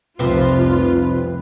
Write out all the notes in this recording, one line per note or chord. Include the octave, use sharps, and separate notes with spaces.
F1 C2 C3 F3 C4 F4 B4